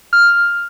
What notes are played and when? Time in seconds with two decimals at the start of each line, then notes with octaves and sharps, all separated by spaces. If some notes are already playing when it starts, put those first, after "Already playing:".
0.13 F6